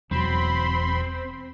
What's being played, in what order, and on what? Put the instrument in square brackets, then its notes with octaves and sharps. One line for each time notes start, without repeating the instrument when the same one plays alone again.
[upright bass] E1 [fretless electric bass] E2 F#3 [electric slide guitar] C4 [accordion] B5 C6